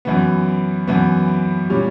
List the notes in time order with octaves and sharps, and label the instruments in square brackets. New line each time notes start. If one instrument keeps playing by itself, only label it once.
[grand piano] F#2 E3 B3
F#2 E3 B3
A#2 G3 C#4